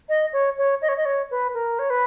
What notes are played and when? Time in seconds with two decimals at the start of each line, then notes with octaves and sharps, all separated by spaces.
0.09 D#5
0.33 C#5
0.58 C#5
0.82 D#5
0.89 C#5
0.97 D#5
1.05 C#5
1.31 B4
1.54 A#4
1.79 C#5
1.90 B4